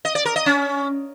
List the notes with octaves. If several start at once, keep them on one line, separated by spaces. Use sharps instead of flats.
D#5
D5
A#4
D#5
C#4